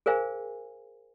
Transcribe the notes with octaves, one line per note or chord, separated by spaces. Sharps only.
G#4 A#4 C5 F5 G#5